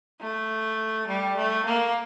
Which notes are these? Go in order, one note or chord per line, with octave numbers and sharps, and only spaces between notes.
A3
G3
A3
A#3